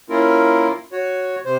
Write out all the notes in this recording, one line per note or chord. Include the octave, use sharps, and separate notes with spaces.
A#3 C#4 E4 F4 A#4
F#4 C#5
C3 C5